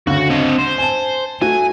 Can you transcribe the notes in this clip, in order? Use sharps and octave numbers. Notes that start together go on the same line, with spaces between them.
D2 C#3 F#4
C4 D#5
C5
G#5 A5
A3 F#4 G#5